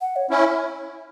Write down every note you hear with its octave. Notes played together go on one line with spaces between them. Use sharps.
F#5
C#5
C#4 E4 C#5